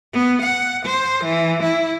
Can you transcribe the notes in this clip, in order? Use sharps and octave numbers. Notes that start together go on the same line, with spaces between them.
B3
F#5
C5
E3
E4